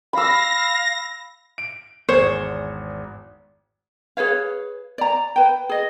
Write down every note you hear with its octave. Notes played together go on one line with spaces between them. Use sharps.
F5 B5 E6 A#6
D7
G#1 E2 G#4 C5 C#5
G#4 B4 C#5 F5
D5 A#5
B4 G5
G#4 D#5